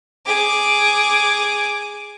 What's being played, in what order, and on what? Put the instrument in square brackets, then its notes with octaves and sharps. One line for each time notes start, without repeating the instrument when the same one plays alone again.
[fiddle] G#4 D6